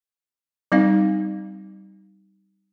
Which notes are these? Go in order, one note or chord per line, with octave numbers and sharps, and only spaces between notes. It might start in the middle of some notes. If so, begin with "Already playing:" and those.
G3 C4 D#4 F5